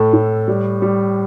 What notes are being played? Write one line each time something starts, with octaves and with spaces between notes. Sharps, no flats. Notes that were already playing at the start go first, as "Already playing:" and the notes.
Already playing: A2 A4
A2
G3
G3